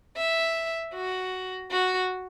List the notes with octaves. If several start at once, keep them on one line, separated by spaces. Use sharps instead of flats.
E5
F#4
F#4